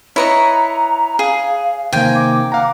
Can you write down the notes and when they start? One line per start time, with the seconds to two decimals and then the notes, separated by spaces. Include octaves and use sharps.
0.16 E4 B4 C#5 D#5 A#5 C#6
1.19 G#4 F5
1.93 C3 D#3 A#3 G5 G#5
2.15 D6
2.52 F5 F#5 A#5